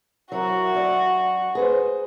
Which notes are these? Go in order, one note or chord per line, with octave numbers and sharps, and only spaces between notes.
F#3 E4 F#4 A#4
F#2 D5
G#4 B4 C5